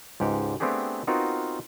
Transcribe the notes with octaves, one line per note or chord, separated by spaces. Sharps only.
C#2 G#2 G4 F#5
A3 B3 C4 D4 G4 G#4
B3 C4 D#4 F4 F#4 A#4